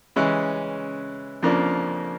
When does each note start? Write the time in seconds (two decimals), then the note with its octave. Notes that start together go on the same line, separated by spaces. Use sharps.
0.16 C#3 E3 G#3 C#4
1.42 F2 C#3 F3 A#3 D4